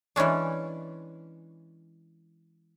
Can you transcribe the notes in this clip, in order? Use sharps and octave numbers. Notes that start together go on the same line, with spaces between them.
E3 G#3 C#4 D4